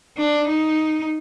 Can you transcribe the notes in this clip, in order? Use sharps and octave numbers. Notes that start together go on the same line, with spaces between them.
D4
D#4